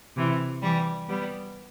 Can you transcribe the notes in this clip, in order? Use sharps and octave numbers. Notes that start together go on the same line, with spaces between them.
C3 E3
E3 G3
G3 B3